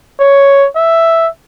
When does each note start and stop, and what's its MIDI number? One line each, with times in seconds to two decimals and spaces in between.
0.20 0.67 73
0.76 1.28 76